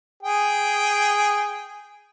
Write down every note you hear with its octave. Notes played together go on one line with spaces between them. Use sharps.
G#4 G5